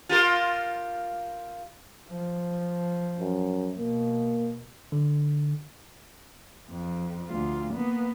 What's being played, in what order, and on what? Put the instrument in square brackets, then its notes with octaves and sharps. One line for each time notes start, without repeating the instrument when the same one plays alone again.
[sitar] F4 G4 A#4
[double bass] F3
[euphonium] F#2
[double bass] B2 [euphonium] A#3
[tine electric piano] D3
[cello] F2
D2 F4
A#3 B3